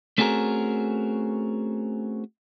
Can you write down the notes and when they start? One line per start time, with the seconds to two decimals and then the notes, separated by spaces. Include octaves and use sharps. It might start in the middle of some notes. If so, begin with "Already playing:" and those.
0.18 A3 C4 C#4 F#4 G#4 A#4